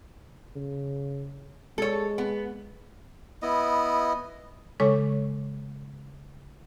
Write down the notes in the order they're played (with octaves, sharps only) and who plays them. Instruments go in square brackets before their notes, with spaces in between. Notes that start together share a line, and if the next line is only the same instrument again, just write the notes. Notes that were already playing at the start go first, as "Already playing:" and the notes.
[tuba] C#3
[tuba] G#3 [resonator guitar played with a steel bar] A4 C#5
[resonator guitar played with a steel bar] B3
[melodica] B3 E4 D#5
[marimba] C#3 G#3 A4 C#5 C#6 D6